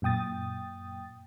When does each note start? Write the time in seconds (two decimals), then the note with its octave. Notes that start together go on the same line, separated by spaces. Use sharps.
0.02 F#2 A#2 G5 D#6 A6